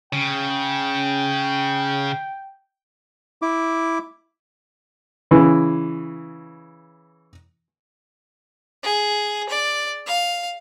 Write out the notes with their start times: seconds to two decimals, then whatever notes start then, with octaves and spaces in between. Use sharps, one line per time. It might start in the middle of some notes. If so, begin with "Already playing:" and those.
0.13 C#3 G5
3.42 E4 D6
5.31 C#3 E3
8.83 G#4
9.49 D5
10.07 F5